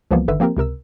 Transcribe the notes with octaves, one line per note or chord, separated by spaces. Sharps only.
C#2 E3 F3 G3 A#3 B3
G1 D3 D#3 B4 E5 E6
F3 A#3 C4 G4 A#4
C#2 C3 A#4 E6